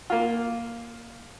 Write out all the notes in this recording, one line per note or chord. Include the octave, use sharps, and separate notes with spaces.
A#3 F4